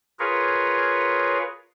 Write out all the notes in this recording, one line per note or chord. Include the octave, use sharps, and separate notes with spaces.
F4 G#4 A#4 B4 C#5